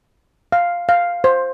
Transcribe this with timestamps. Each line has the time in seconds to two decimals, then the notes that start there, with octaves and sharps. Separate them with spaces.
0.52 F5
0.89 F5
1.24 C5